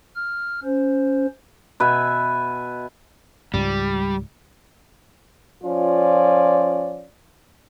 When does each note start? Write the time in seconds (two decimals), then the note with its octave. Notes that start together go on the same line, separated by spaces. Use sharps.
0.15 F6
0.64 C#4 C5
1.80 B2 B4 E5 G#5
3.54 C#2 G#2 G3
5.64 F3 C#4 F4 D5